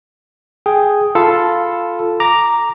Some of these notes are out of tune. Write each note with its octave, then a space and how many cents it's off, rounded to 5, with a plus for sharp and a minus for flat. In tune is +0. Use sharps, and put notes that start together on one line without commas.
G#4 +0 G5 +0
F4 +0 A4 +0 B5 +0
A#5 +0 D6 +0